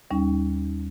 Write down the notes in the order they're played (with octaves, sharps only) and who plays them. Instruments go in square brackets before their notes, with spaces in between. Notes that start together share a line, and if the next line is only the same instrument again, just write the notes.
[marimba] D#2 G3 C#4 D#4